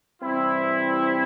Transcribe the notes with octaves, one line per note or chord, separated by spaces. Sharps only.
C3 E3 G3 C4 E4